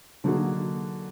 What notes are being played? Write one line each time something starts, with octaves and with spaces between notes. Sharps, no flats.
D3 F#3 A#3 D#4 F#4 G#4